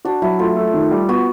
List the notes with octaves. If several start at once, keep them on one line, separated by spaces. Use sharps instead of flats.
D4 F#4
F#3 E4
A3 F4
A3
D#3
G3
B3 F#4